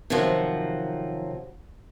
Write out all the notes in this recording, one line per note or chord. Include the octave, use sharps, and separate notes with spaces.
C3 D#3 F3 F#3